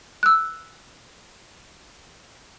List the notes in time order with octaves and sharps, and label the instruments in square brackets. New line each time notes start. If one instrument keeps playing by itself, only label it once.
[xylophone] E6 F#6